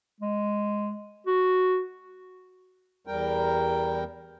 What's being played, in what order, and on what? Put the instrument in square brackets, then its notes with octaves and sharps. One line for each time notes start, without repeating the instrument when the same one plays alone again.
[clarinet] G#3
F#4
[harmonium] E2 G3 A#4 G5